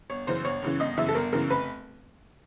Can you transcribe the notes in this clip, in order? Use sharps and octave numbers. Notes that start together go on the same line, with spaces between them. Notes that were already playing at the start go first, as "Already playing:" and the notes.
G1 C#5
F#2 C#3 E3 C5
G1 C#5
F#2 C#3 E3
G1 D#5
F#2 C#3 E3 E5
A4
G1 A#4
F#2 C#3 E3 A#4
F1 B4